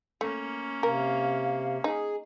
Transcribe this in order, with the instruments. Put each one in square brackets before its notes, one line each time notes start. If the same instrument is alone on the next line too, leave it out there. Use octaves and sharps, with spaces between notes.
[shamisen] A3 [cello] A#3 C#4
[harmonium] C3 [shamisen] A#4 [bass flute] F5
[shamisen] D#4 [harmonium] G#4